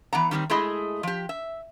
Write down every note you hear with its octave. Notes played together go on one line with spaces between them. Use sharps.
E3 B3 F#5 A#5
D#3 G3 B3 C4
G#3 A3 E4 G#4 D#5
F3 G4
E5